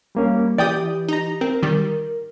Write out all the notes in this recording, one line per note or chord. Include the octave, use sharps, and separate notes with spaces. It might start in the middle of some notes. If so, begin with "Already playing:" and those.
G3 A#3 C#4
E3 G4 D5 G5 D#6
D#4 A#5
C4 A#4
D#3 G3